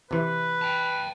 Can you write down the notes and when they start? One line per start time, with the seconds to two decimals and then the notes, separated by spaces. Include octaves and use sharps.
0.11 C3 E3 B4
0.62 G5 A5